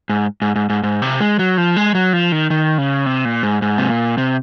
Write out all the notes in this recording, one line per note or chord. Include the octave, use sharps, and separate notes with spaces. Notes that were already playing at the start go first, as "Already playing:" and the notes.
G#2
G#2
G#2
G#2
G#2
C3
G#3
F#3
F3
G#3
F#3
F3
D#3
D#3
C#3
C3
A#2
G#2
G#2
C3
A#2
C3